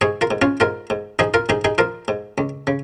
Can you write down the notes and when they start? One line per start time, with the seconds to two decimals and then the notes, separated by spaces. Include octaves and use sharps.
0.01 G#2 G#4 C#5
0.21 F4 A#4
0.31 G#2
0.42 C#4 F4
0.60 G#2 F4 A#4
0.90 G#2
1.19 F3 D#4 G#4
1.34 F4 A#4
1.49 G#2 D#4 G#4
1.65 D#4 G#4
1.78 F3 F4 A#4
2.08 G#2
2.38 C#2
2.67 C#3